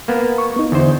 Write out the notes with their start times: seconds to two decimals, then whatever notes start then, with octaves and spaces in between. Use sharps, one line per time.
0.08 A#3 B3
0.38 C#6
0.56 B3 D#4
0.72 E2 D3 C5